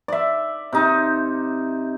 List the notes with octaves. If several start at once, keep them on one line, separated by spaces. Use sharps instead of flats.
D5 E5
C3 D#4